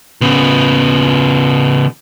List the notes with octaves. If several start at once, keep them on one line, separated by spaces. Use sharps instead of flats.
C#3 B3